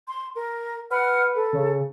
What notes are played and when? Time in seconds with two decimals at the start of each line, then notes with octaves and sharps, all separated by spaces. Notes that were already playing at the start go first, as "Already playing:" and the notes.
0.08 C6
0.34 A#4
0.91 B4 F#5 F6
1.34 A4
1.53 C#3